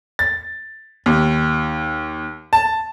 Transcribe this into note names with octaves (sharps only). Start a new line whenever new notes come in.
A6
D#2
A5